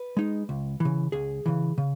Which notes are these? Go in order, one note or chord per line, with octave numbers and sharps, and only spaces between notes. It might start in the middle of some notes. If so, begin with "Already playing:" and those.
Already playing: B4
G#3 D#4
C#2
C#3 E3
C#2 G#4
C#3 E3
C#3